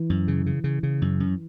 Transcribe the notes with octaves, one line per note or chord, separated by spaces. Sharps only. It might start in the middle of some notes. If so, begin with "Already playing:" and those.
Already playing: E3
F#2
C#3
C#3
C#3
C#3
F#2
F#2